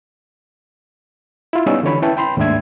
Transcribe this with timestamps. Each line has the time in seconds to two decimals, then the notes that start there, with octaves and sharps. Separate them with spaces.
1.53 E4 F4
1.66 G3 B3 C#4 D#4 E6
1.83 D3 E3 C#5 B5
2.02 C#4 E4 B4 G5 A5
2.17 G5 B5 C6
2.37 D#2 G#2 A3 D4 E5 G#6